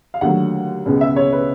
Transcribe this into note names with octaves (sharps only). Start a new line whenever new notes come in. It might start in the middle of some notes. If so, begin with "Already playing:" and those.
F5
D#2 D3 F#3 A3 F#5
C#2 B2 G#3
E5
C#5
B4